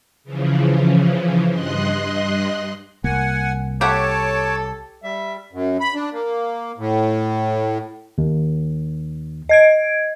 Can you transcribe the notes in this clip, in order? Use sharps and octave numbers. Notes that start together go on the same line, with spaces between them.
C#3 E3 F3
G2 D#5 C6 F#6
C2 A#3 F#5 G#5
G4 A4 C#5 E5 F#5 A5 D6
G3 E5
F#2
B5
D4
A#3
A2
D#2
D#5 G#6 D7